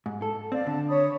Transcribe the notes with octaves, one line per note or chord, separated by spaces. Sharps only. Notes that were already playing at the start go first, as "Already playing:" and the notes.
G#2
A4
C4 D5 F5
D3 A5
C#5 B5 D#6